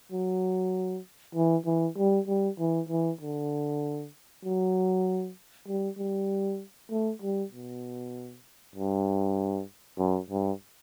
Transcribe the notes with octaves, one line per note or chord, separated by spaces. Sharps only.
F#3
E3
E3
G3
G3
E3
E3
D3
F#3
G3
G3
A3
G3
B2
G2
F#2
G2